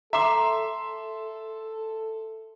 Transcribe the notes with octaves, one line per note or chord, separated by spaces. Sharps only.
A4 E5 A#5 C6 D6